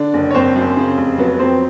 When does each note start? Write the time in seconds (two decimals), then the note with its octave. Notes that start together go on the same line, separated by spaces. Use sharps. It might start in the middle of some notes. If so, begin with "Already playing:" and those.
Already playing: D3 D4 D5
0.14 F#1
0.31 C#5
0.34 F#1 C4 C5
0.56 F#2
0.77 C#3
0.97 F1
1.18 F#3 B3 B4
1.34 B4
1.39 F2 C4 C5